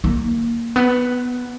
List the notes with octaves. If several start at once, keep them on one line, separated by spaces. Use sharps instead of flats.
A#3
B3